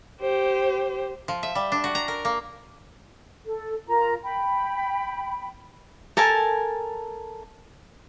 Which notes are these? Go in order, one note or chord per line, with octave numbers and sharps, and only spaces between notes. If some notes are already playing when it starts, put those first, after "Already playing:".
G4 C5
F3
E5
G3
D4
F#4
A#5
A#4
A#3
A4
F4 A#4 A#5
G5 B5
A4 A#4 G#5 A5